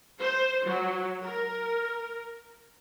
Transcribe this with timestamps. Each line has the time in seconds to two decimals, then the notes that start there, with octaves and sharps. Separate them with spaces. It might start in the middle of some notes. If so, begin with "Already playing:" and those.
0.21 C5
0.65 F#3
1.22 A#4